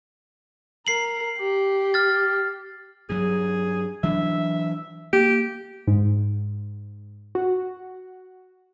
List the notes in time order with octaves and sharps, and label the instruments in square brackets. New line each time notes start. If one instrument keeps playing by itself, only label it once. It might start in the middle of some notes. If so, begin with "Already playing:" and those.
[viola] A#4 [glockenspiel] C7 F#7
[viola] G4
[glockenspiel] F6 A6
[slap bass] G2 F#3 [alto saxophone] G#4
[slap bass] E3 F#3 D4 [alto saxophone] E5
[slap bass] A#3 [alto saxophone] G4
[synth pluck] G#2
F#4